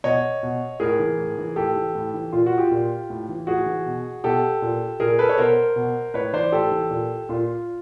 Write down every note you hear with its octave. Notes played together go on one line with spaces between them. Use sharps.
B2 C#5 D#5
B2
A2 G#4 A#4
E3
A2
E3
A2 G4 A4
E3
A2
E3
A#2 F4
F#4
F4 G4
A#2
A2
E3
A2 F#4 G#4
E3
B2
B2 G4 A4
A#2
A#2 G#4 A#4
A4 B4
C#5
B2 A#4 C5
B2
A2 B4 C#5
E3 C5 D5
A2 G4 A4
E3
A#2
A#2 F4